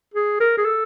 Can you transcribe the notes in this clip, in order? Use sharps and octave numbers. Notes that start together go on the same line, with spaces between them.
G#4
A#4
G#4
A4